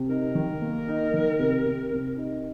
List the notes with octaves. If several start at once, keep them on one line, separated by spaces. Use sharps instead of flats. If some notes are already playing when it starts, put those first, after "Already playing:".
Already playing: C3
D#4 A#4
D#3
A#3
D#4
D#3
C3
C3
C3
D#4